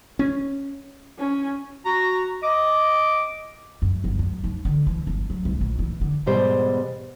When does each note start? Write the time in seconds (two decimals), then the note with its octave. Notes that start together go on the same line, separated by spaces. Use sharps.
0.19 C#4
1.18 C#4
1.85 F#4 A#5
2.43 D#5 D6
3.82 F#2
4.04 G1
4.19 F#2
4.44 D#2
4.65 D3
4.87 E3
5.07 G1
5.30 F#3
5.45 C2
5.61 A#1
5.79 E3
6.01 D3
6.26 E2 G#2 B2 G3 C5